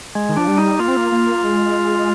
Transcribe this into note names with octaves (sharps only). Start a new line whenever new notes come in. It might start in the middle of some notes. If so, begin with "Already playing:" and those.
G#3
D#3
F3 D4
G3
D#4
A#3 F4
C4
A#3
A#3
G#3